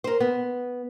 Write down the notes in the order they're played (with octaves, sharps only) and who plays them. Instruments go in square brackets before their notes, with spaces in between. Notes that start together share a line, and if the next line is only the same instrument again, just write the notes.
[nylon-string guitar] A#4 C5
B3